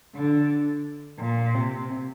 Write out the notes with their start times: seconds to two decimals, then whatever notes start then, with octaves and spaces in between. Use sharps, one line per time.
0.15 D3
1.19 A#2
1.54 C3